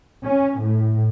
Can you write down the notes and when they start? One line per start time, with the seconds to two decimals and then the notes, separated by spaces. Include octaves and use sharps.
0.24 C#4
0.60 A2